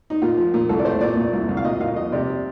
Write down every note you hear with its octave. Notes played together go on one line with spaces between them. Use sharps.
D#4
A#2 F4
F3
A#2
C2 A4
D5
A3 C5
A#2 D5
A#2
C2
C2
F5
A#2 D#5
A#2 F5
F3 D#5
C3 D5